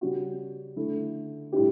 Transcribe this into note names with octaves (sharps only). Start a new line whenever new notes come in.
C#3 G3 C#4 F#4
D3 A3 E4
A2 G3 D4 G4